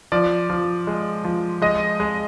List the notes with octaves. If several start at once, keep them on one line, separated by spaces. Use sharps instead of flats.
F3 D5
F3
G#3
F3
G#3 D#5
G#3